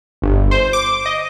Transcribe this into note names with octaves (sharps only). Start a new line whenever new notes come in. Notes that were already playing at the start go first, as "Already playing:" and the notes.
G1
C5
D6
D#5